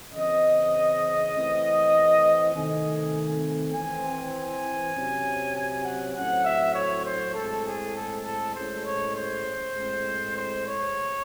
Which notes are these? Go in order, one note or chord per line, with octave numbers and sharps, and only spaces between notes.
C#3 E3 C4 D#5
E3 A3 C4
C3 D#3 A3 C4 G#5
E3 C4 G#5
G#5
C3 F#3 C#4
G#5
F#5
A2 F#3 C4 F#5
E5
C#5
C5
A2 G#3 C4 A4
G#4
A4
A4
A2 G#3 C#4 C5
C#5
C5
A2 G#3 C4
C5
C#5